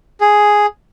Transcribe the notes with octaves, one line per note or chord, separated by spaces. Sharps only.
G#4